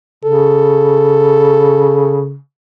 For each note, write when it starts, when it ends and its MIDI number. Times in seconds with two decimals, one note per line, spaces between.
0.24 2.36 49
0.24 2.26 69